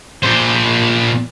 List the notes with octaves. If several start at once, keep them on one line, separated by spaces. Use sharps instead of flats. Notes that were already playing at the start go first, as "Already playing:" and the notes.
A#2 C5